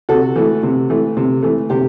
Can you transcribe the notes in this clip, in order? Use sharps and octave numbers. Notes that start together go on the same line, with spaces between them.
C3 F#4 A4
E3 A3
C3
E3 A3
C3
E3 A3
C3 G4